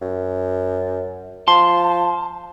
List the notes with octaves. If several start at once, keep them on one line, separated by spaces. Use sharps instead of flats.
F#2
F3 A5 C6